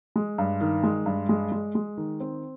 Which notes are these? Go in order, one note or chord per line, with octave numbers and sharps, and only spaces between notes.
G#3
G2
D#3
G#3
G2
G#3
G#3
G#3
D#3
C4